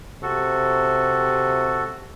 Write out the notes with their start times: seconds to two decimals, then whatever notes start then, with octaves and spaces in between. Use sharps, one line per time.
0.23 C3 F#4 A4